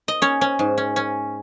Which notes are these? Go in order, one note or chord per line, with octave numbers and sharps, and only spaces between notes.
D#5
C#4 C#5
C#4
G#2
C#4
C#4